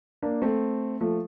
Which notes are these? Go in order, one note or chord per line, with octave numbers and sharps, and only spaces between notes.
A#3 D4
A3 C4
F3 A3